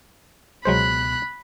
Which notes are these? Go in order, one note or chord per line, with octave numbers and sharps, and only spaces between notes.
C#2 B2 F#3 G#3 C5 B5 F#6